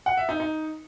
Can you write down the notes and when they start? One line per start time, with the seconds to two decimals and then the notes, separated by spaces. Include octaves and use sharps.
0.06 F#5
0.17 E5
0.29 D#4
0.40 D#4